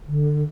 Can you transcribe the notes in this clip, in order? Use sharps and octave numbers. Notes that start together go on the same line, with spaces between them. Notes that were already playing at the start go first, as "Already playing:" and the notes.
D3